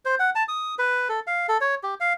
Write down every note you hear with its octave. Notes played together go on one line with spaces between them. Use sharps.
C5
F#5
A5
D#6
B4
A4
F5
A4
C#5
G4
F5